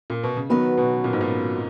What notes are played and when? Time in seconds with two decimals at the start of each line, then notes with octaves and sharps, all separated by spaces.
0.10 A#2
0.23 B2
0.36 C#3
0.50 D#3 F#3 B3 F#4 B4
0.77 B2
1.04 A#2
1.13 G#2
1.21 A#2